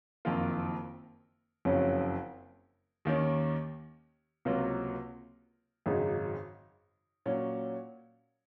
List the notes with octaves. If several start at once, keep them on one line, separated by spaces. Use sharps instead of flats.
F#1 F2 D#3 A#3 F4
F#1 F2 C#3 F#3 C#4
D#2 D#3 A#3 C#4
C#2 C3 F#3 A#3 F4
G#1 F#2 C#3 G#3 D#4
A#2 F#3 C#4